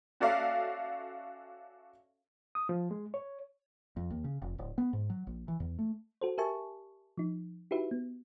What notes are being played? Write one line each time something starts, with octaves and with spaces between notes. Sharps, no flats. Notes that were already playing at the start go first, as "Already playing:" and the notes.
C#4 F#4 A4 D5 E5 F5
D#6
F3
G#3
C#5
F2
D#2
C#3
F1
D1
B3
G#2
F#3
A#1
E3
E2
A3
F#4 A4 C5
G4 A#4 E5 G#5 A5 C#6
F3 D#4
D#4 E4 F#4 G4 B4 E5
B3